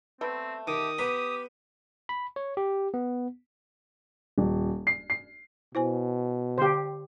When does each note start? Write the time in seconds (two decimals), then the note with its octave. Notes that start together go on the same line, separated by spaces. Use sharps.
0.21 G3 A3 B3 C4
0.68 D#3 G4 D#6
0.98 B3 G4 A#5 B5
2.09 B5
2.36 C#5
2.57 G4
2.94 B3
4.38 D#1
4.87 C7
5.10 C7
5.75 B2 E4 C5 G#5
6.58 D3 G4 C5 F5